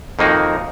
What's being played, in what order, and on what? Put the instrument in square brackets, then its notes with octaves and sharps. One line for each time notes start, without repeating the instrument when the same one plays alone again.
[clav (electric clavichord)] F2 D#3 A#3 D#4 F#4